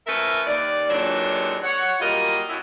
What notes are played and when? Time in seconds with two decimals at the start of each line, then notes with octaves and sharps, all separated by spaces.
0.07 F3 A3 C#4 A#4 B4 E5
0.47 D#2 D5
0.90 D#2 A#2 E3 F#3 G#3 D4
1.63 C#5 F#5
2.00 F#3 G3 A#3 F4 A#4 D#5
2.49 F#2 E4